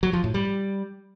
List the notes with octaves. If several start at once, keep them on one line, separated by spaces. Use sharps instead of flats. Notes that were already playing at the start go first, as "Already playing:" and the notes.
F#3
F3
A2
G3